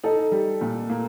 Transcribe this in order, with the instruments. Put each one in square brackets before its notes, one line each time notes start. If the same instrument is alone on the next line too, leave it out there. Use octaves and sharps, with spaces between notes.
[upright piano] D#4 [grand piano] A4
[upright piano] G3
A#2
A#3